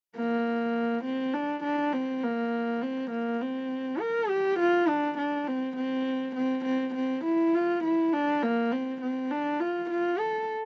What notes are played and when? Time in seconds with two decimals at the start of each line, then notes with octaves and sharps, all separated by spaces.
0.16 A#3
1.04 C4
1.34 D4
1.64 D4
1.93 C4
2.23 A#3
2.81 C4
3.11 A#3
3.41 C4
4.00 A#4
4.29 G4
4.59 F4
4.88 D4
5.18 D4
5.47 C4
5.76 C4
6.36 C4
6.65 C4
6.95 C4
7.24 E4
7.54 F4
7.84 E4
8.13 D4
8.43 A#3
8.71 C4
9.02 C4
9.31 D4
9.60 F4
9.90 F4
10.19 A4